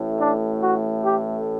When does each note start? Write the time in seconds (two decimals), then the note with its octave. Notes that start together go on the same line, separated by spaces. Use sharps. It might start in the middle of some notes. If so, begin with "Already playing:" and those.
Already playing: A1 A2 A3
0.20 D4
0.62 F#4
1.03 G4